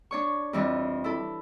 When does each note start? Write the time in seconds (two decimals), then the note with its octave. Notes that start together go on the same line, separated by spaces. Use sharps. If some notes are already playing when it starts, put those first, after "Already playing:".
0.11 D4 C#5 C#6
0.53 F2 E3 G3
1.04 E4 A4